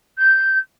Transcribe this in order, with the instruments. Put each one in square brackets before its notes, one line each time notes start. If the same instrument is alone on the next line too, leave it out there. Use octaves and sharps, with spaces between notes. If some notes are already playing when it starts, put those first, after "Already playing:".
[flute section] G6